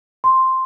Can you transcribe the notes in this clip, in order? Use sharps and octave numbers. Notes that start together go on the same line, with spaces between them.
C6